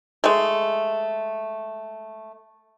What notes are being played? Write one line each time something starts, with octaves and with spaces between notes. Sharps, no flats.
G#3 A3